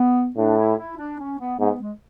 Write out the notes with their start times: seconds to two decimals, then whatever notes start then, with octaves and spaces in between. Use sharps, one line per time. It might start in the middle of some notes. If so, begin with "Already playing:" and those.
Already playing: B3
0.37 A2 D4
0.58 E4
0.77 E4
0.98 D4
1.19 C#4
1.39 B3
1.59 G#2 B3
1.80 G#3